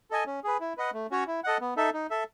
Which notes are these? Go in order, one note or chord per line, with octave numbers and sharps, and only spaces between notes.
A4 D#5 G#5
C#4
G#4 B4
E4
B4 D#5 F#5
A3
C#4 F#4 C#5
E4
A4 D#5 F#5
B3
D#4 A4 E5
D#4
A4 E5